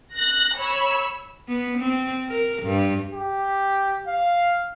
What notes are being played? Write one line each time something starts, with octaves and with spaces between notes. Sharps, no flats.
F#6 A#6
C#5 B5 E6
B3
C4
A#4
G2
G4
F5